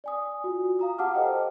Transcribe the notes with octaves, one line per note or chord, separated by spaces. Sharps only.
D5 G#5 D#6
F4 F#4
F5 A#5 D#6
G4 F#5 A5 D6 F6
A4 C5 D#5 G5